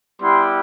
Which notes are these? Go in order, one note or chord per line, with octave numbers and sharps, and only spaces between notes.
G3 B3 E4 G4 C6